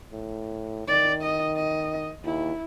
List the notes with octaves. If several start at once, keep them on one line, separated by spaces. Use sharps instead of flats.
A2
D#3 D5
D#5
D#5
D#2 E4